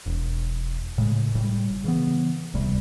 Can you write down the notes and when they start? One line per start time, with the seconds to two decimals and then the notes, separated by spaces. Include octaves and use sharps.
0.06 E1
0.98 A2 C#3 G#3
1.35 G1 A2 G3
1.84 C#3 E3 B3
2.54 D1 C2 C3 G3